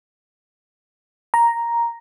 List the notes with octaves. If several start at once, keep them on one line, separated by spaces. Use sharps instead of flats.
A#5